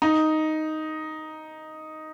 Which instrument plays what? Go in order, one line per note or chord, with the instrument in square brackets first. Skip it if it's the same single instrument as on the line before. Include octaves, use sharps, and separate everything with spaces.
[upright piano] D#4